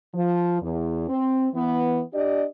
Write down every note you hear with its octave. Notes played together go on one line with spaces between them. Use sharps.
F3
E2
C4
E3 B3
D4 G4 D5 D#5